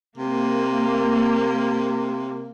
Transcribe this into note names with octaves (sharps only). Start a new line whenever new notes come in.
C3 A#3